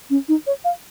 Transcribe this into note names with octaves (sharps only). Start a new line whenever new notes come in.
C#4
D#4
C#5
F5